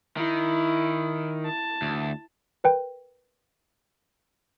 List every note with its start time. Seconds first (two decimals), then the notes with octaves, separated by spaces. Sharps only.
0.17 D#3 E4
1.46 A5
1.82 D2
2.64 A#4 B4 G5